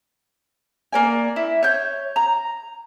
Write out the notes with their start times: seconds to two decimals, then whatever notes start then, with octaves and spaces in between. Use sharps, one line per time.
0.93 A#3 D5 G#5
1.36 E4
1.63 C#5 G6
2.16 A#5